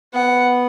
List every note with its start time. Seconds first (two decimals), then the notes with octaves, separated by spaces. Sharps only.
0.14 B3 F#5